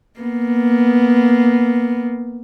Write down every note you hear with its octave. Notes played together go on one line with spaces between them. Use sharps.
A#3 B3